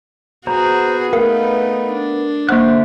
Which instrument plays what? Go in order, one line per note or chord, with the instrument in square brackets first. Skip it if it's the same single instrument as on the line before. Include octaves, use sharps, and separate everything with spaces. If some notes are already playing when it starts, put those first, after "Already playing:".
[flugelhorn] B3 [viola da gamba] F#4 G#4 [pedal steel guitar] C5 A#5
[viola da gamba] A3 D#4 [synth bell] A#4 [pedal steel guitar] B4 F5
[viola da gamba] D4
[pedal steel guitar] D3 E5 F#6 [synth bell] A#3 F#5 [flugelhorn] C5